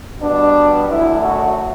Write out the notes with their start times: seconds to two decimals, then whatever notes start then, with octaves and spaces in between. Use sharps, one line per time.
0.19 B2 G3 B3 D4
0.88 F#2 D3 A3 E4
1.22 F#4